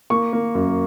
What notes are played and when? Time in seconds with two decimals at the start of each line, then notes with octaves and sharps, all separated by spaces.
0.10 A#3 C#6
0.33 A#3
0.55 F#2